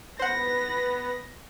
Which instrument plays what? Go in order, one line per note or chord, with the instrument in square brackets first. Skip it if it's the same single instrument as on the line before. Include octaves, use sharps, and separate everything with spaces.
[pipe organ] B3 [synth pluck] C5 F#5 [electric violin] B5 A#6